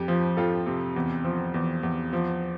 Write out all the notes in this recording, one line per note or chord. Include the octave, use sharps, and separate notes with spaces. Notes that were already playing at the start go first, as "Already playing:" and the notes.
Already playing: F2 G4
F3
F2 F4 A4
C3
E2
F3
E2
E2
F3